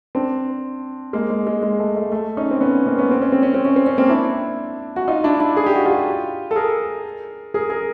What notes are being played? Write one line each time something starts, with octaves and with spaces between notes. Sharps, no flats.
C4 D4
G#3 A#3
G#3
G#3
G#3
A3
A3
A3
C#4 D#4
C4
B3 C#4
A#3 C4
B3 C#4
C4
C#4
C4
C#4
C4
C#4
C4
C#4
A#3 C4
D4 E4
F#4
D#4 F4
D4 E4
D4 E4
G#4
G4
F#4
F4 G4
A4
G#4 A#4
G#4 A#4
G#4 A#4